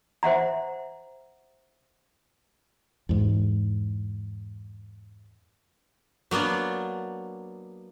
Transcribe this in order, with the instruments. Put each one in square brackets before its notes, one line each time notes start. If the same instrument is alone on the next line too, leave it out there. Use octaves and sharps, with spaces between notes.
[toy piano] C5 E5 F#5 A#5
[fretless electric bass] E2 G#2
[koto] F#3 A#3 B3 D4